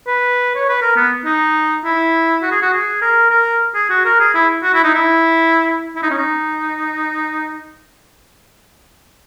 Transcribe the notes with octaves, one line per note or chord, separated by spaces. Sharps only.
B4
C#5
B4
A#4
B3
D#4
E4
F#4
G#4
F#4
G#4
A#4
A#4
G#4
F#4
A#4
G#4
E4
F#4
E4
D#4
E4
E4
D#4
C#4
D#4